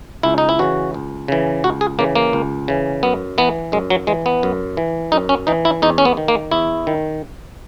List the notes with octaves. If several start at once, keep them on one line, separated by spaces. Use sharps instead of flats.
C#2 E4
D#4
E4
C#3 E3 F#4
C#2
C#3 E3
C#2 F#4
G#4
C#3 E3 A#3
A#3
C#2
C#3 E3
F#2 B3
E3 B3
F#2 G#3
F#3
E3 G#3
B3
F#2
E3
F#2 D#4
C#4
E3 D#4
E4
E2 D#4
C#4
B3
D#3
A#3
E2 E4
D#3